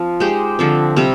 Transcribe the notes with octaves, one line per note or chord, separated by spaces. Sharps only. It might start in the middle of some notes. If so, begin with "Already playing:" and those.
Already playing: F3 C4 F4
G#3 D#4 G4 C5
D3 F3 C4
C3 G3 C4